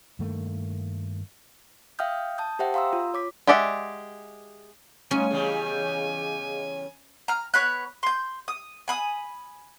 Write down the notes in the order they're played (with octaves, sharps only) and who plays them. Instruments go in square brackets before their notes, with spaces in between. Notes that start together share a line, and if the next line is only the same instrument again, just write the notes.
[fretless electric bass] G2 D#3 A3 A#3
[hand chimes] E5 F5 G5 D#6 F6 G6
A5 D#6 G6
G4 C5 E5 F#5 G5
F5 A#5 C6 D#6 E6
F4
C#5 D6 B6
[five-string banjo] G#3 G4 D5 E5 F#5
[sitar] G#2 [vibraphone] G3 A3 F5 [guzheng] C#4 [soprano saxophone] G#5
[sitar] E2 C#3 G3 [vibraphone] G#4 D#5 F5
[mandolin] A#5 F6
B3 C#5 B5 F#6
C6 G6
D#6
G#5 B5 D#6